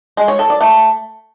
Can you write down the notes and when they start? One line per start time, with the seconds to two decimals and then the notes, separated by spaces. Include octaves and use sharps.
0.17 G#3
0.28 C#5
0.39 A4
0.50 D5
0.61 A3